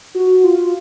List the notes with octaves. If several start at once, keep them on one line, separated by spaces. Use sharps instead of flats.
F#4
F4